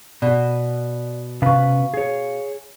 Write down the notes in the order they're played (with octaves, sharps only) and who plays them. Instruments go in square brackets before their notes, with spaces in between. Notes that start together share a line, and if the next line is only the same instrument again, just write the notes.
[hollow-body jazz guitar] B2 [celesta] D5
[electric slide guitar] C3 C#4 B4 [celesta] F5 C#6
[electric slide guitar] G#4 C#5